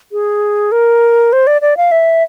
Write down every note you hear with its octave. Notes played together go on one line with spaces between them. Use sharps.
G#4
A#4
C5
D5
D5
F5
E5